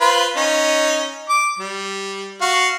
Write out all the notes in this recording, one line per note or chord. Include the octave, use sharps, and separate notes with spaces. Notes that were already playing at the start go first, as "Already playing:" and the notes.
F4 B4 C5
C#4 D#4
D6
G3
F#4 F5